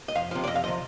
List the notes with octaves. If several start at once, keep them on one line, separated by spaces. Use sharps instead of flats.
D#5
F2 F5
C3 F3
D5
F2 D#5
F5
C3 F3 D#5